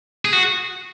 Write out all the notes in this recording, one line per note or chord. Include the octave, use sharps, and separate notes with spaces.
G#4
F#4